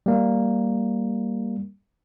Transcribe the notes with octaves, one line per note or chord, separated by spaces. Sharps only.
G3 A#3